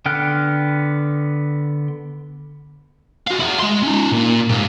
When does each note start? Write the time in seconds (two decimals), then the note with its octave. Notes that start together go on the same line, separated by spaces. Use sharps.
0.06 D3 B3 G5 F6 F#6
3.27 F#4 F5
3.40 E4 G#4
3.60 G#3 C6
3.83 C#4 D#4
4.12 A#2
4.49 G#2 G4